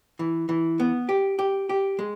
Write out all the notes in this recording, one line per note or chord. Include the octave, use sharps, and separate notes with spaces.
E3
E3
B3
G4
G4
G4
G#3